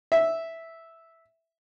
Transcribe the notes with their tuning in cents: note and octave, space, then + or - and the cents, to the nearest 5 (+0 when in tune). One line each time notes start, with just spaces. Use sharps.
E5 -5